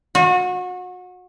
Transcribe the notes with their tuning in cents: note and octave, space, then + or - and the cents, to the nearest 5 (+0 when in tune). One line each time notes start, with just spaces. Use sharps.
F#4 -30